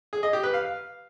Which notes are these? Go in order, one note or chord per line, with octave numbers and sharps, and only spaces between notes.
G#4
D#5
G4
B4
F5